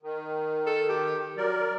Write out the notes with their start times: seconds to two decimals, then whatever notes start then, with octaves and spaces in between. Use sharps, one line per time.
0.02 D#3
0.66 A4
0.89 G4
1.37 F#3 A#4 D5